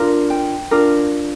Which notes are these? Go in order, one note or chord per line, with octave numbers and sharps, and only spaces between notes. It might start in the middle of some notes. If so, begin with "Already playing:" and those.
Already playing: D4 F4 A#4
G5
D4 F4 A#4